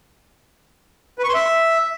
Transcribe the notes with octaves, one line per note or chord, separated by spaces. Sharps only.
B4
C#6
C6
E5